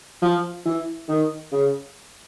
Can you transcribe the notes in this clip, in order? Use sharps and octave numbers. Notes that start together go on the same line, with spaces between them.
F3
E3
D#3
C#3